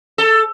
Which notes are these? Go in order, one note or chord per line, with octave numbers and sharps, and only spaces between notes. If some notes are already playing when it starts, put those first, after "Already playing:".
A4